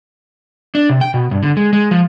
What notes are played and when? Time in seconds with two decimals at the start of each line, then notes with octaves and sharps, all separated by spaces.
0.75 D4
0.89 C3
1.01 G5
1.14 B2
1.31 G2
1.42 D3
1.57 G#3
1.73 G#3
1.91 F3